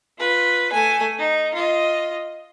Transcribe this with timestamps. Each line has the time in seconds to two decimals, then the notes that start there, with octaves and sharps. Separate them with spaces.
0.18 F4 B4
0.73 A3 G#5
1.19 D#4
1.54 F4 D#5